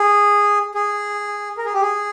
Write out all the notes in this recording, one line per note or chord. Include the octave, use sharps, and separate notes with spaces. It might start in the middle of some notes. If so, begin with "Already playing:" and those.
Already playing: G#4
G#4
A#4
G#4
G4
G#4